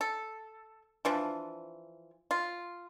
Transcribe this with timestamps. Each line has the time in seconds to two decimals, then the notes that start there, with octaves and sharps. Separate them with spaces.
0.01 A4
1.05 E3 F3 D4
2.31 F4